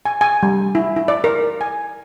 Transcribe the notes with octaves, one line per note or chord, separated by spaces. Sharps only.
G#5
G#5
G3
E4
E4
D5
A#4
G#5